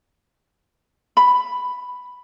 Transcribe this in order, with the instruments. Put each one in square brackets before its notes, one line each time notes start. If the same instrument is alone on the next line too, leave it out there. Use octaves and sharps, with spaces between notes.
[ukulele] B5